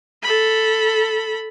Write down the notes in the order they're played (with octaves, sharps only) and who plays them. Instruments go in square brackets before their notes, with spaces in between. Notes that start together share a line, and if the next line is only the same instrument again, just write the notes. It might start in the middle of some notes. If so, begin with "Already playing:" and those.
[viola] A4 B5